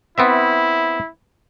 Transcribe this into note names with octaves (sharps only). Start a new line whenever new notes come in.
B3 C4 E4 E5